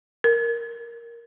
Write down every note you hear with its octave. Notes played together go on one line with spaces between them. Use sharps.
A#4